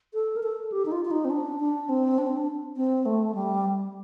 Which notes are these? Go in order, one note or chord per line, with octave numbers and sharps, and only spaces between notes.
A4
A#4
A4
G4
D#4
F4
F4
D#4
C4
D4
D4
C4
D4
C4
D4
C4
A3
G3